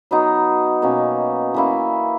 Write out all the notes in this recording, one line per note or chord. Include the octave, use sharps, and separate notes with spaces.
F#3 B3 D#4
B2 A#3 C#4
E3 A#3 C#4 E4